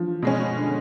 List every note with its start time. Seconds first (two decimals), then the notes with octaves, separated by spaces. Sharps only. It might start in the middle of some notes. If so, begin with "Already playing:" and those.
Already playing: F3
0.22 B2 G#3 C#4
0.56 D3